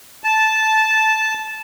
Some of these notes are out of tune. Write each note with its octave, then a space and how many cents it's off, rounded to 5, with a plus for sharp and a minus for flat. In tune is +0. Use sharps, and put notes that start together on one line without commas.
A5 -10